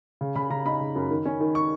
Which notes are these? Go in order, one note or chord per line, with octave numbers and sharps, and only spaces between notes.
C#3
C#3 B5
C#3 A#5
D#4 B5
C#3
F#2
D#3
C#4
D#3
C#6